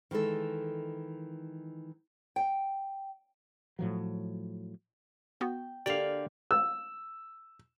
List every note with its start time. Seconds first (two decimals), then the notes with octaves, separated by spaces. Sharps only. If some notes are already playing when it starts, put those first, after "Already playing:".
0.11 D#3 E3 G#3 A4
2.36 G5
3.79 A2 F3 F#3
5.41 B3 F#4 G5
5.86 D3 A#3 G4 D5 F5
6.51 E6